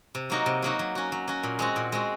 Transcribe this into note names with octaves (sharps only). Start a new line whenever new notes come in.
C3
F#3 A#3 D#4 F#4
C3
F#3 A#3 D#4 F#4
F#3
C#4 F#4
F#3
C#4 F#4
A#2
G#3 C4 F#4
A#2
G#3 C4 F#4